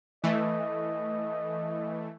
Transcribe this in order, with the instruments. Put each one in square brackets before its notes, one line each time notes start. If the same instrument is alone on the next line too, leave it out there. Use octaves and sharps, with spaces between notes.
[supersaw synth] E3 A3 [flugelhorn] D#5